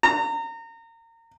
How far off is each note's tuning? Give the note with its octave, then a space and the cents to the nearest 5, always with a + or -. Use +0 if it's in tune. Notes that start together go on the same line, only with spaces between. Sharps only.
A#5 -30